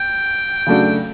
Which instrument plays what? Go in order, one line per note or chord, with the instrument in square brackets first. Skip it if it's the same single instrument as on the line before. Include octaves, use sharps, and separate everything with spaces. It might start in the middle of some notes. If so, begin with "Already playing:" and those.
Already playing: [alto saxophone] G5
[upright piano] C#3 F#3 A3 D4 F#4